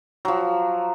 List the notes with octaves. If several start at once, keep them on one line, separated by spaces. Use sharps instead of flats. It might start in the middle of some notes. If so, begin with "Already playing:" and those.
F3 F#3